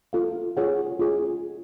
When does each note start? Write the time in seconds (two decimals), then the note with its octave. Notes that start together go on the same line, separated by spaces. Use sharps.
0.13 F4 A4 F5
0.57 F4 G#4 C#5 F#5
1.00 F4 G#4